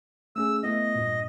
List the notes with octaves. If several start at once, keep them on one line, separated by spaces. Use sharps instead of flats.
A3 C#4 G#4 E6
A3 B3 E4 D#5
G2 A#2